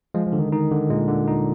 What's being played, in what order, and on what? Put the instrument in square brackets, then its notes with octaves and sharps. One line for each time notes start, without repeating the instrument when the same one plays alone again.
[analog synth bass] F3 [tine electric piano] G#3
[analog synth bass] F3
[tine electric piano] D3
[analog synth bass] D#3
[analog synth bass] D#3 [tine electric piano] D#4
[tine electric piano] D3
[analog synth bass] A#2 [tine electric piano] G#3
[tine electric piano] D3
D#4